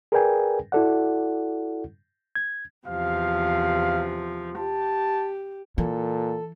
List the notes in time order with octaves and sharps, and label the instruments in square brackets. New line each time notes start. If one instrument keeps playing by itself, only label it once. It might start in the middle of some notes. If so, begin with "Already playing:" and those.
[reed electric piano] G#4 A#4 B4 D5 G5 G#5
E4 F#4 A4 D5 F#5
G#6
[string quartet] E2 C3 F3 [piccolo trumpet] F5
[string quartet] G4 [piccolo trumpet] A5
[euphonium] A#2 [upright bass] E3 [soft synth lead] A4